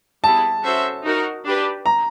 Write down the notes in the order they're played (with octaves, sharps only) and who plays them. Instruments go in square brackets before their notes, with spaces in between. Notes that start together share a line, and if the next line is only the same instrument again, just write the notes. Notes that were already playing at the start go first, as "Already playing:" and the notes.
[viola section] G3 B3 E4 G#4 [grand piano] A5
[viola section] C#4 F#4 A4 C5 E5
D#4 F#4 A#4
D4 G4 B4
[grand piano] A#5